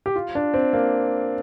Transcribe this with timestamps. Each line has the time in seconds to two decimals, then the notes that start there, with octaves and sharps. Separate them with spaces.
0.06 G4
0.16 F4
0.35 D4
0.54 C4
0.73 A#3